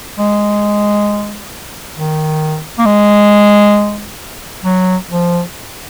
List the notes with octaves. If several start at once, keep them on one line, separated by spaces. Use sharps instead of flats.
G#3
D#3
A#3
G#3
F#3
F3